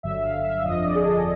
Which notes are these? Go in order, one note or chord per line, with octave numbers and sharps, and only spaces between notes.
G1 G2 D3 F#3 E5
F5
E5
G1 F2 D3 F3 D#5
D5
G#4
A4